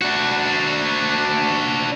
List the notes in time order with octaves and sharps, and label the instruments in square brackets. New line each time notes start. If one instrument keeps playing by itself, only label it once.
[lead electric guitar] D4 F#4